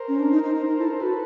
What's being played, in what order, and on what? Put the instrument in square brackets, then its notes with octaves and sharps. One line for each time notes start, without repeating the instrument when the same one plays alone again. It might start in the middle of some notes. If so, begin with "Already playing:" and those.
Already playing: [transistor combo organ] A#4 C5
[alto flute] C#4
D4
D#4
D#4
D#4
D#4
[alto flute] E4 [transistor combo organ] A4
[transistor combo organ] A#4
[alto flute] F#4 [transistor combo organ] A4 B4